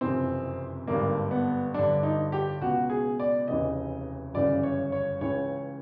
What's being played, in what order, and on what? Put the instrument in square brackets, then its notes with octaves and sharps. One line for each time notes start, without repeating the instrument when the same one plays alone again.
[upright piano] F#1 F2 C3 E3 C4
G#1 G2 D3 A#3
B3
G1 G2 D3 D4
D#4
G4
C#2 B2 F#4
G#4
D5
F1 D#2 C#3 E3 D#5
G1 F#2 C#3 E3 D5
C#5
C#5
C#2 C#3 E3 C#5